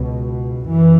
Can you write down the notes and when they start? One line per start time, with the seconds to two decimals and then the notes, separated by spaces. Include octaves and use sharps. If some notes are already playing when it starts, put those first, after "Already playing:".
Already playing: C#2 B2
0.67 F#2 E3